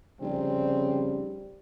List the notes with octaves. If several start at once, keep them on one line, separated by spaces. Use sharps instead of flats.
F1 C#3 G3 C4